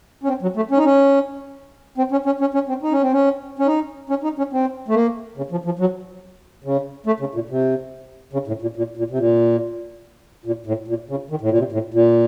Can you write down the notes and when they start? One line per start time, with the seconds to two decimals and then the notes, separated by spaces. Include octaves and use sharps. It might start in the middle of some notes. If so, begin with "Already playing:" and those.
0.23 C#4
0.28 C4
0.42 F#3
0.56 A3
0.71 C#4
0.77 D#4
0.85 C#4
1.98 C4
2.12 C#4
2.26 C#4
2.41 C#4
2.54 C#4
2.69 C4
2.83 D#4
2.92 C#4
3.02 C4
3.12 C#4
3.59 C#4
3.67 D#4
4.10 C#4
4.24 D#4
4.38 C#4
4.53 C4
4.88 A3
4.94 A#3
5.37 C#3
5.51 F3
5.65 F3
5.79 F#3
6.64 C#3
7.06 A3
7.20 C#3
7.35 A#2
7.49 C3
8.33 C#3
8.47 A2
8.62 A#2
8.77 A#2
8.97 A#2
9.11 C3
9.18 A#2
10.45 A#2
10.66 A2
10.88 A#2
11.09 C#3
11.30 D#3
11.41 A2
11.50 A#2
11.58 C3
11.72 A2
11.94 A#2